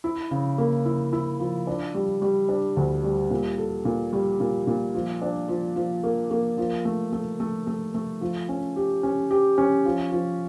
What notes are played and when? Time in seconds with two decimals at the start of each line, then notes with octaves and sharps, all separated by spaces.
0.04 E4
0.31 C#3
0.58 A#3
0.86 E4
1.13 E4
1.40 F3
1.67 D4
1.94 G3
2.22 G3
2.49 D4
2.77 D2
3.03 G3
3.30 A#2
3.58 A4
3.85 A#2
4.13 G3
4.40 A#2
4.67 A#2
4.95 F3
5.22 D4
5.48 F3
5.76 F3
6.03 A#3
6.31 A#3
6.58 F3
6.85 A3
7.12 A3
7.40 A3
7.67 A3
7.94 A3
8.21 F3
8.49 C#4
8.76 G4
9.03 C#4
9.31 G4
9.58 C#4
9.85 F3
10.12 F3